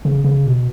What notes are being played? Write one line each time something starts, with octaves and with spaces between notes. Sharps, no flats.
C#3
C#3
B2